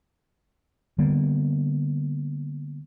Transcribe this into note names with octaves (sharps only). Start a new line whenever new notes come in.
D3 G3 A#3 B3